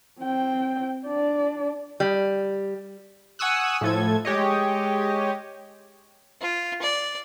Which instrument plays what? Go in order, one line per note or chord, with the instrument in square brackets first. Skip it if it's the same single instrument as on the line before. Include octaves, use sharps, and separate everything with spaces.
[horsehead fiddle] C4 G5
D4 D5
[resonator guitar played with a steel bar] G3
[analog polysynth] F#5 G#5 C#6 D#6 E6 F#6
A2 F3 A4 G#6
G#3 G4 C#5 D#5
[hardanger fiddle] F4
D5